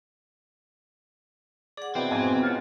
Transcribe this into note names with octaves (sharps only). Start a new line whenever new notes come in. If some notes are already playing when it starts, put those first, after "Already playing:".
G#4 D5 F#5
B2 C4 E4 B4
F2 G#2 B3 G#4 G#5
C#4 F4 F#5